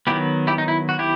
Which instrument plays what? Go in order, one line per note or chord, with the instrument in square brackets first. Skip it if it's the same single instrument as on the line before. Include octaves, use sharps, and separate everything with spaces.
[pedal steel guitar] D#3 F#3 B3 E4 G4
E4 G4
D#4
E4
F#4
E4 G4